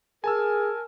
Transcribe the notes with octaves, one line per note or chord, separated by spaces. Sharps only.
G#4 A#4 G#5 A5 E6